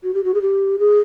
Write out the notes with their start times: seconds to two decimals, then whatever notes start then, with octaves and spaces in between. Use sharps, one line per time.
0.03 F#4
0.14 G4
0.24 F#4
0.34 G#4
0.41 G4
0.79 G#4